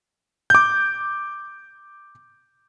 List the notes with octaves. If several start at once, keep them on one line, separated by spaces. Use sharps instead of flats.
D6 G6